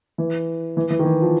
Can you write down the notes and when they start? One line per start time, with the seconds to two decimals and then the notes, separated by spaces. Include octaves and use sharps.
0.18 E3
0.77 E3
0.90 E3
0.99 D#3
1.05 E3
1.22 F3